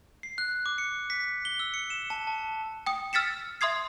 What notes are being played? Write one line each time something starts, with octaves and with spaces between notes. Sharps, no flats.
C7
F#6
D6
C#7
B6
G7
E6
C#7
E7
A5
A5
G5 D#6
E6 F6 A6 B6 C#7 E7
E5 C6 D#6 G#6 C7